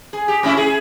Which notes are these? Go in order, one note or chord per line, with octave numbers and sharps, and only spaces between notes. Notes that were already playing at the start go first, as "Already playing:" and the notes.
G#4
G4
A2 C#4 E4
G#4